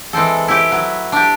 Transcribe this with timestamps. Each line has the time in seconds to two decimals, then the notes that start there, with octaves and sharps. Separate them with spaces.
0.13 E3 G#3 C4 A4
0.48 E4 G4
0.71 F#3 B4
1.12 D4 G4